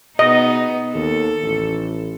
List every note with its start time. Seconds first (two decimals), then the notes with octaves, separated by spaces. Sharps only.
0.19 B2 B3 D#4 D#5
0.94 D#2 A4
1.43 A1